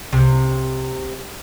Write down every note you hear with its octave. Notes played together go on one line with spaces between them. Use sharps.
C2 C3